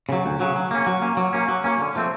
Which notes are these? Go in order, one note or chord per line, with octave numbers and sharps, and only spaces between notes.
C#3 F#3
D2
C#3 F#3
F#3
A#3 C#4
F#3
A#3 C#4
F#3
A#3 C#4
F#3
A#3 C#4
D3
F3 A3 C4